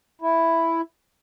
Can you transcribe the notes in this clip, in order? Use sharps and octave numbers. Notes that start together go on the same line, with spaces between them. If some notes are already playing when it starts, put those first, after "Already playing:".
E4